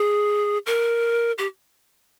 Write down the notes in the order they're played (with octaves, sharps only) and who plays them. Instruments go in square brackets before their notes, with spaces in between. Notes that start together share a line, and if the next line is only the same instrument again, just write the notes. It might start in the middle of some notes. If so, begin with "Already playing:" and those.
Already playing: [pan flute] G#4
A#4
G4